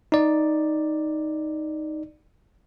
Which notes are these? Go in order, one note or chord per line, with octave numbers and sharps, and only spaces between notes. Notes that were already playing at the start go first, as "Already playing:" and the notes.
D#4 D5